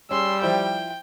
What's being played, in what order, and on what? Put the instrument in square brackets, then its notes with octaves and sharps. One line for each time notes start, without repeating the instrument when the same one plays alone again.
[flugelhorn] G3 [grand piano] C#4 G#4 [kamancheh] C6 E6
[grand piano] F3 E4 C5 [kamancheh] G5